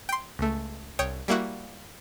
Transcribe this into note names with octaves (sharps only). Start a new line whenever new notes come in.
G5 C6
C#2 A3
C2 C#5 G5 D#6
G3 A#3 E4 F#4